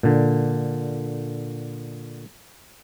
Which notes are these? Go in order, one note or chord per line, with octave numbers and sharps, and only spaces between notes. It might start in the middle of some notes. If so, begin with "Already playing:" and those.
A#2 D3